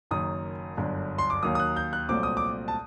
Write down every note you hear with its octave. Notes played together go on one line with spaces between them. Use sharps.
F#1 F#2 D#3 D#6
G1 F#2 D3
C6
D6
D#2 D#3 F#3 A#3 D#6
D#6
F#6
G6
F#6
C2 A#2 F#3 A3 C4 D6
D#6
D6
A5